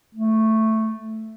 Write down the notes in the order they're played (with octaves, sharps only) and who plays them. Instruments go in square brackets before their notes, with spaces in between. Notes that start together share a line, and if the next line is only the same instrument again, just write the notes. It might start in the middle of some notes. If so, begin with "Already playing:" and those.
[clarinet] A3